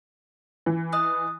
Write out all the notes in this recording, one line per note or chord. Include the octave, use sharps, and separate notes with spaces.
E3
D#5 D#6 F#6